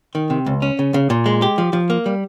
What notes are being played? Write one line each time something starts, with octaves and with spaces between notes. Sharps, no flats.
D#3
C3
C#2
C#4
C#3
C#3
A#2
G#3
G4
F3
F3
A#3
G3